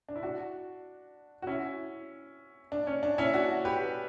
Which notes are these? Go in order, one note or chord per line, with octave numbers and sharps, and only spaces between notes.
D4
E4
D4 F#4
F#4
C#4 E4
D4
C#4
D4
C#4 E4
D4 F#4
G4 B4